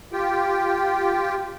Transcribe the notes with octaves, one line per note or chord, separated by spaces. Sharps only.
F4 G4 G5